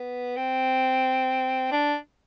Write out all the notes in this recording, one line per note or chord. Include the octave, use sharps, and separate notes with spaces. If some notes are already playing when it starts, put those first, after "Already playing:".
Already playing: B3
C4
D4